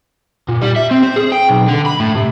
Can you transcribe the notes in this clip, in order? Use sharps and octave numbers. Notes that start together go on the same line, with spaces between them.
A#2
G3
E5
C4
C5
G#4
G5
B1
D3
B5
A2
C3